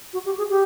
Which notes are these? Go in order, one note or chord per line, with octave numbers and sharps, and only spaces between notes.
F#4
G4
G#4
G4